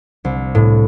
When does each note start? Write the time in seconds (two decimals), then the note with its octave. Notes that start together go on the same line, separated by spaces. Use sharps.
0.25 C2
0.55 A2